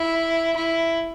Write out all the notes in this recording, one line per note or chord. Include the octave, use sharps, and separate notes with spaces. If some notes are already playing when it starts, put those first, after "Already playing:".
Already playing: E4
E4